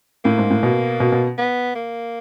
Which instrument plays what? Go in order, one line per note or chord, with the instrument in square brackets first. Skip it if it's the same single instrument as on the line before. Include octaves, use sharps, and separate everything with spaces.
[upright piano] A2 [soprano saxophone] A#3
[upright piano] G#2
A2
B2
B2
B2
[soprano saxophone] B3
A#3